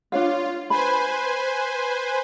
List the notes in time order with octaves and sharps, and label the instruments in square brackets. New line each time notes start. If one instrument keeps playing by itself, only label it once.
[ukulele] D4 C#5 F5 [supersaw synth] F4
[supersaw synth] B4 C5 G#5 [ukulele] B5